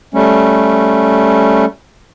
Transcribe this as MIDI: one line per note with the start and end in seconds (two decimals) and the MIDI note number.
0.14 1.65 55
0.14 1.65 57
0.14 1.65 61